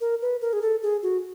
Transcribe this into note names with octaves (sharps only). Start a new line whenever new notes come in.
A#4
B4
A#4
G#4
A4
G#4
F#4